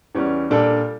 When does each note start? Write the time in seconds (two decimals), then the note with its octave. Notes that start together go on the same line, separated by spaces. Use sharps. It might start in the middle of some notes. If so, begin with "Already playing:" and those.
0.15 E2 E3 G3 C#4
0.50 A#2 G3 D4 A4